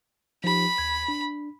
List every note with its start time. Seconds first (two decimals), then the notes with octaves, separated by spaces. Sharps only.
0.44 F3 D#4 G4 B5
0.78 D#2 G#6
1.08 D4